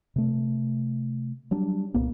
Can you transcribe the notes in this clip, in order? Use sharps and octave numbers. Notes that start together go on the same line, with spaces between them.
C3 A3
F#3 G3 D4
C2 A#2 A#3 B3